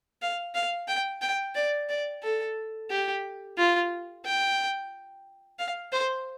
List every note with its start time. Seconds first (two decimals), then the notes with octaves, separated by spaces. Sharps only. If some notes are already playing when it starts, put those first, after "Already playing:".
0.22 F5
0.55 F5
0.88 G5
1.21 G5
1.55 D5
1.89 D5
2.23 A4
2.90 G4
3.57 F4
4.25 G5
5.59 F5
5.92 C5